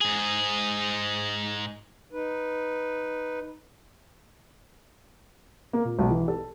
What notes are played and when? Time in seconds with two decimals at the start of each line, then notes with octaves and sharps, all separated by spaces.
0.01 G#2 G#4
2.11 D#4 B4
5.73 A#3
5.85 A#2
5.99 B1
6.10 E3
6.28 A4